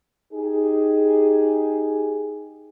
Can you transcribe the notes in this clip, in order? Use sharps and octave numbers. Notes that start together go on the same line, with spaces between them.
D#4 G4 G#4